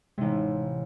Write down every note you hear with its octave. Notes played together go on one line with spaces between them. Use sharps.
A1 C3 G#3 D#4